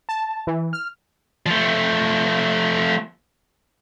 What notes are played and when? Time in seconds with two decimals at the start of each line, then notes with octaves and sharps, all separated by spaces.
0.09 A5
0.47 E3
0.73 F6
1.46 F3 A3